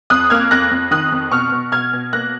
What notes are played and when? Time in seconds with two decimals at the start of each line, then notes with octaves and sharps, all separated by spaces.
0.10 F2 D#6 F#6
0.30 A#3 F6 G#6
0.51 F2 F#6 A#6
0.71 F2
0.91 D#3 D#6 F#6
1.12 F2
1.31 B2 C#6 F6
1.52 B2
1.72 B2 F6 G#6
1.93 B2
2.13 A#3 F#6 A#6